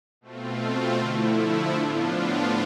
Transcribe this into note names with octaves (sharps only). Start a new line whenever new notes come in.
B2 A3 C4 F4
D3 F3 A3 E4
A2 F3 B3 D4 F4